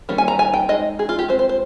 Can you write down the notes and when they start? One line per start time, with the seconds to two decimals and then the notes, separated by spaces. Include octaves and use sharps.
0.09 D#3 G3 A#3 C#4
0.18 G#5
0.28 A#5
0.39 G#5
0.54 G5
0.69 G#3 D#4 D#5
0.99 G#4
1.09 F4
1.19 G4
1.28 G#3 C4 F4 C5
1.39 C5
1.49 C5